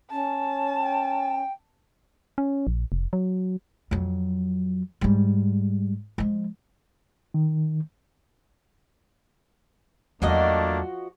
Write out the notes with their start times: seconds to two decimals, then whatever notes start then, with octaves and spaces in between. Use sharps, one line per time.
0.11 C#4 A5
0.79 G5
2.38 C#4
2.67 A#1
2.92 F1
3.13 F#3
3.91 F2 F#3
5.01 G#2 G3
6.18 F3 G#3
7.34 D#3
10.22 E2 F3 F#3 A3 A#3 D4 F#4 D#5